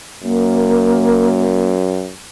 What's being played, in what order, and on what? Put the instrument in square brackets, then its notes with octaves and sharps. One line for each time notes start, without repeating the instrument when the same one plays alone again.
[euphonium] F#2 [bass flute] A#3